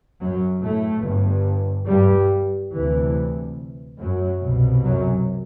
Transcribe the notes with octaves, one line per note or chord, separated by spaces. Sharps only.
F#2 F#3
A2 A3
G1 G2
G2 G3
D2 C3 E3
F#2 F#3
C2 B2
F#2 F#3